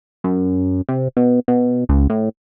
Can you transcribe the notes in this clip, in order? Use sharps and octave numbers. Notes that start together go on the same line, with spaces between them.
F#2
C3
B2
B2
C#2
A2